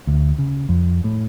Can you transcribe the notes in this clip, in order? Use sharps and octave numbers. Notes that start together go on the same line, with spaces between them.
D2
C#3
F2
A2